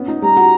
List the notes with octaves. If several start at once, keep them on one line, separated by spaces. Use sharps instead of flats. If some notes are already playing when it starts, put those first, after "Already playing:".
Already playing: B3 C#4
D#4
G3 A#5
F#4